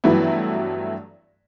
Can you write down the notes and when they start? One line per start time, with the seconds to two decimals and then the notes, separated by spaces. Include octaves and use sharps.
0.04 G2 E3 F#3 A3 B3 E4